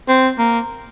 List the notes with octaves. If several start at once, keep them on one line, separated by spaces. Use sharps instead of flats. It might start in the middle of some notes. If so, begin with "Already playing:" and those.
C4
A#3